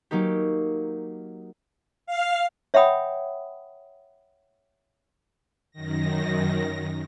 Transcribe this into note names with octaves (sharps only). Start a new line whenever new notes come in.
F#3 A#3 D#4 G4
F5
C#5 E5 F#5 G5 B5 D#6
F#2 D#3 A#6